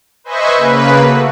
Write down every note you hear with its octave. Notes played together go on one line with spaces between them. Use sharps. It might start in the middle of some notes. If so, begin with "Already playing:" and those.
B4 C5 D#5 E5 G#5 C#6
C#3 A#3 B4
A3 F#4